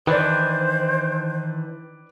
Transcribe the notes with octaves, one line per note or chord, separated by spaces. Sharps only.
D#3 E3 D4 B4 C5 D5